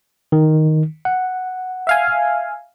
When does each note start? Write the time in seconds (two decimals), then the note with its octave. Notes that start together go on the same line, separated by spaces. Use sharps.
0.32 D#3
1.05 F#5
1.87 E5 F5 G#5